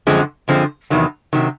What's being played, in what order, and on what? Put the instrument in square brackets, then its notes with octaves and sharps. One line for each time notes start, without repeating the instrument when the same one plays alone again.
[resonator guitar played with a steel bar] F#2 D3 F3 G#3 C4
F#2 D3 F3 G#3 C4
E2 C3 D#3 F#3
C3 D#3 F#3